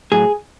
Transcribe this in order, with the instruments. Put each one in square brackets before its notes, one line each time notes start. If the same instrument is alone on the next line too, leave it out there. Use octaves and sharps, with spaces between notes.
[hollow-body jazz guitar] A2 F#3 G#4